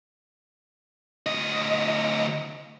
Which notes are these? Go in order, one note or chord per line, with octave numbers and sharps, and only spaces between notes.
D2 D#5